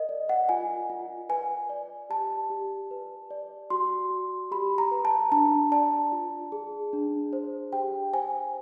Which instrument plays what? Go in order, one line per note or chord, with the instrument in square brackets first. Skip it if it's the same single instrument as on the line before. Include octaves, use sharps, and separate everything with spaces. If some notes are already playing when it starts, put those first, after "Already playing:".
Already playing: [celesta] A#4 D#5
D5
F#5
F4 G#5
F4
B4 G#5
D5
G4 A5
G4
B4
D5
F#4 C6
F#4
G4 B5
A#5
B4
A5
D4 A5
D5 A5
F4
G#4
D4
C5
G4 G5
C5 G#5